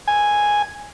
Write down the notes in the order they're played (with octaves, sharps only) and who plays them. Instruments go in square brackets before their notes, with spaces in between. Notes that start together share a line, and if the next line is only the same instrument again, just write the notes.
[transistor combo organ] G#5